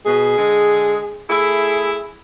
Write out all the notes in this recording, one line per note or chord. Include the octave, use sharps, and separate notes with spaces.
B2 G#4
D3 G#3
A3 E4 G#4